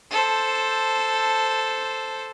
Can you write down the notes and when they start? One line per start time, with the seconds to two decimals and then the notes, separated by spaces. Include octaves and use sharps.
0.10 A4 C5